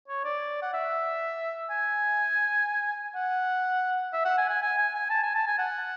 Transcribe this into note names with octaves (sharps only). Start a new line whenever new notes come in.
C#5
D5
F#5
E5
G#5
F#5
E5
F#5
G#5
G#5
G#5
G#5
G#5
A5
G#5
A5
G#5
F#5